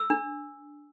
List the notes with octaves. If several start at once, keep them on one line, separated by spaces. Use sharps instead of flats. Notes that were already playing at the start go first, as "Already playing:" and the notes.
Already playing: E6
D4